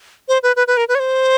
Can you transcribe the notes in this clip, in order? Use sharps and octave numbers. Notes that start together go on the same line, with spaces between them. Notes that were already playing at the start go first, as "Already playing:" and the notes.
C5
B4
B4
B4
A#4
B4
C#5
C5